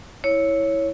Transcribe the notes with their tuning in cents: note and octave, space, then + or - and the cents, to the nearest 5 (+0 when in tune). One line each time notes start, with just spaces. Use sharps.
E4 -10 C#5 +0